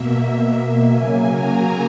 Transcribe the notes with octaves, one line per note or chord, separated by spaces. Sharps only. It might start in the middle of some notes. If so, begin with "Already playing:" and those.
Already playing: B2 A#3 E5
C#3 F#3 A#3 G#5
A#5